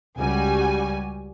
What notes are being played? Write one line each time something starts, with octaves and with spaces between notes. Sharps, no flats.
C#2 G3 F#4 G#5